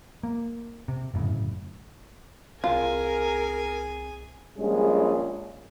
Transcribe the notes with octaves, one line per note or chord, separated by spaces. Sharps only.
A#3
C3
G1 F#2 A2 C#3
C2 C4 F4 G#4 A#4 G#5
A#1 G3 G#3 C#4 G#4